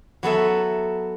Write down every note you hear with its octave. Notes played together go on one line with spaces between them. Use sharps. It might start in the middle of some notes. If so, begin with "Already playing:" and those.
F#3 B3 A4 E5